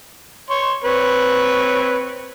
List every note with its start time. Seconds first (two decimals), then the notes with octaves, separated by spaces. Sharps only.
0.50 C#5 C6
0.84 C4 B4 C#5